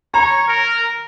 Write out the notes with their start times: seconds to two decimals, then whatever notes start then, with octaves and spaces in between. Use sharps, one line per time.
0.14 C#5 A#5
0.48 A#4